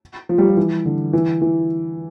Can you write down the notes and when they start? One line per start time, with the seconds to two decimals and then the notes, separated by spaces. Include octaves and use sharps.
0.29 F3
0.38 G3
0.48 F3
0.57 E3
0.85 D3
1.13 E3
1.42 E3